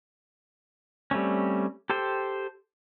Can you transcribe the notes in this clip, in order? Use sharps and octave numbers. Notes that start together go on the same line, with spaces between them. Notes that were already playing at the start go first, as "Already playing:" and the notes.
G3 A3 C4 C#4
G4 A4 C5 G5